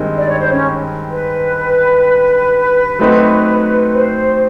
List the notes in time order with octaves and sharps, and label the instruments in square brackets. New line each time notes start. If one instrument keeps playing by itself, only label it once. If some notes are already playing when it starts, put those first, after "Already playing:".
Already playing: [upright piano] G2 D#3 G#3 C4
[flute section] D5
C#5
C5
C#4 C#5
B4
[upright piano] F#3 A3 C4 D#4 F#4
[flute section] C5